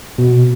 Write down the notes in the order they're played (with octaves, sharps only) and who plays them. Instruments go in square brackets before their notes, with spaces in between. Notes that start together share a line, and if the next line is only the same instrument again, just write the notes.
[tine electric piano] B2